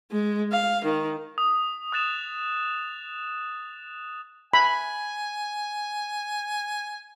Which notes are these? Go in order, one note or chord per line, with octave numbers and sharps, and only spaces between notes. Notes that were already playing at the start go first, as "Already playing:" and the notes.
G#3
F5
D#3
D#6
D#6 F#6 A6 E7 F7
G#5 B5